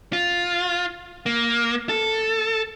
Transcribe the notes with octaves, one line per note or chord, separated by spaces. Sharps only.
F4
A#3
A4